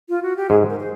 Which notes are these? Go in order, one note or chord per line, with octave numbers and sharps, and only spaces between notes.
F4
F#4
G4
G#2 G#4
A#4
C5